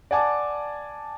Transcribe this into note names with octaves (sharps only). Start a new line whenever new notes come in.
D5 F#5 G#5 A5 D6